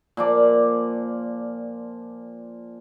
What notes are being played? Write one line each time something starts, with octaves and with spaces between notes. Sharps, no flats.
A#2 F3 D5